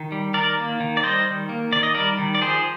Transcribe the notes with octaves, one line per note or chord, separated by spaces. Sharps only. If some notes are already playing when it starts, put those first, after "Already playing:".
Already playing: D#3
G3
D#3 A#4 D5
A#3
D#3
D5
G3 C5 D#5
D#3
A#3
D#3 D5
D#5
G3 A#4 D5
D#3
D5
F3 G#4 C5